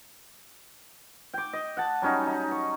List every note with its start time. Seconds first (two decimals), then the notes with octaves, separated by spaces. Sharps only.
1.34 G5 D6
1.53 D#5
1.77 F#5 A5
2.02 F#3 G3 C#4 D#4
2.27 D#4
2.52 C#6